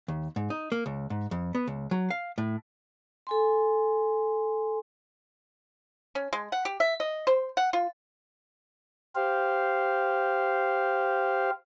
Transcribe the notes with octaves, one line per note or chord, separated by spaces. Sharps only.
D#2
G#2
D#4
A#3
C#2
G#2
F2
B3
C#2
F#3
F5
A2
A4 G#5 C6
C#4
G#3
F#5
G4
E5
D#5
C5
F#5
F4
G4 C5 F5